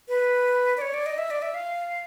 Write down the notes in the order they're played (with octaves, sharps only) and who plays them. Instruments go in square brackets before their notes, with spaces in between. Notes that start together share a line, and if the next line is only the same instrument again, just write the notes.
[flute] B4
D5
C#5
D5
D#5
E5
D5
E5
F5